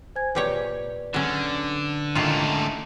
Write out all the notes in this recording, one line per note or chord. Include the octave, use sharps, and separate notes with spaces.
C5 G#5 G#6
A#2 G4 B4 C#5 D5
D3 F#3 C#4
G#2 D#3 A3 C#4 F4